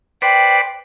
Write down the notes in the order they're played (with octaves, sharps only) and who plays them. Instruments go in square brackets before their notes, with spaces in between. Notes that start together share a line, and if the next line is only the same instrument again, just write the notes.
[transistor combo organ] B4 C5 D5 [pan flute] G5